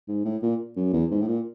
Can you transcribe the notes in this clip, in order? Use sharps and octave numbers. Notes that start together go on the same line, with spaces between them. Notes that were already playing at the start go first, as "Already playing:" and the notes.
G#2
A2
A#2
F#2
E2
G#2
A2
A#2